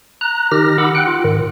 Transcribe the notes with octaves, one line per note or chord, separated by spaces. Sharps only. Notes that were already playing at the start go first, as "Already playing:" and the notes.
A#5 F#6
D#3 D#4 G4 F6 A#6
F#5 B5 D6 E6
F#5 G5 F#6
F4
G#2 D#3